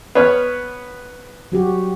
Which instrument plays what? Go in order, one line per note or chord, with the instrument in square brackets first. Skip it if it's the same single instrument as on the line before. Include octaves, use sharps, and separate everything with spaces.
[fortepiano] B3 C#5 F6
[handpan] F#3 F#4 G4